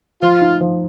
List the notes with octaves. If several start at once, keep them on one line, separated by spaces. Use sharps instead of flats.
F3 F4
D#4
F3